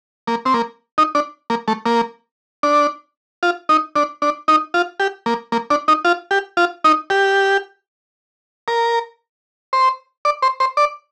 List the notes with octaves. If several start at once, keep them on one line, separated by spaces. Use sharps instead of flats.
A#3
C4
A#3
D#4
D4
A#3
A3
A#3
D4
F4
D#4
D4
D4
D#4
F4
G4
A#3
A#3
D4
D#4
F4
G4
F4
D#4
G4
A#4
C5
D5
C5
C5
D5